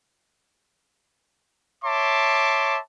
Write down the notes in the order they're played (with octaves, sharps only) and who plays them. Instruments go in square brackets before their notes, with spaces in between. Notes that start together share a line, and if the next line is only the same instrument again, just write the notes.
[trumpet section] C#5 E5 A5 C6 D6